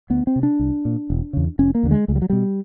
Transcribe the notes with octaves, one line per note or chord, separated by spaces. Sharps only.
D2 B3
C4
C3
D4
C2
A#2
E1
E2 C#3
F1 C#4
A#3
D#2 D3
G#3
C#2 G#3
G3
F#3
B2 G3